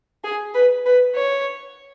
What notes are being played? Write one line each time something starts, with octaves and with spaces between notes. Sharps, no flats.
G#4
B4
B4
C#5